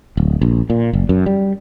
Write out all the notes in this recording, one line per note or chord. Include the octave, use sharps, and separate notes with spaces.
D1
A#1
A#2
F#1
F#2
G3